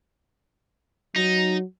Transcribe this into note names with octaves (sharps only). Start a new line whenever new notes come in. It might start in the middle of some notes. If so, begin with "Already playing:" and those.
F#3 D#4